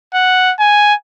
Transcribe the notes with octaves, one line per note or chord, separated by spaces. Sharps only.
F#5
G#5